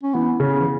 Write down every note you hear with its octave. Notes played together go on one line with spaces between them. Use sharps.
C#4
E3 B3
C#3 B3
E3